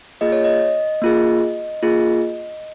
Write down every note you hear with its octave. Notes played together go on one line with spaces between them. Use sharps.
A#3 F4 G#4 D#5
C#5
D#5
A#3 F4 G#4
A#3 F4 G#4